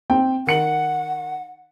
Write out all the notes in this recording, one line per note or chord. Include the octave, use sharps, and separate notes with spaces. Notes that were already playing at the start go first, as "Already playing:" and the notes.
C4 G5
D#3 F#5 C#7 F#7